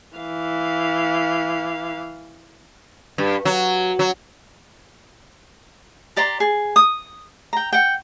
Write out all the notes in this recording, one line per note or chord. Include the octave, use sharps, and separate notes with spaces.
E3 F5
G2
F#3
F#3
G4 D5 A#5 C6
G#4
D#6
G5 A#5
F#5 G5